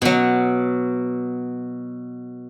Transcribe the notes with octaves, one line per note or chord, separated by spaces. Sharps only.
B2 F#3